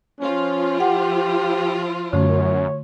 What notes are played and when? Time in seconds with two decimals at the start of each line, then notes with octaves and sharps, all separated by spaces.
0.21 F3 C#4 F4
0.80 G4 F#5
2.13 F#2 D3 A3 C#5